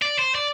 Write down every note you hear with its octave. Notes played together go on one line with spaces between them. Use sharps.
D5
C5
D5